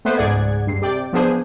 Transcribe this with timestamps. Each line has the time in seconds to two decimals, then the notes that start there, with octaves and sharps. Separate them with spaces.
0.05 A3 B3 B4 C5
0.17 C#2 G#2 G#4 D5 F#5 G#6
0.67 G2 C7
0.82 C3 D5 G5 D6
1.13 F3 B3 D4 G#4 C5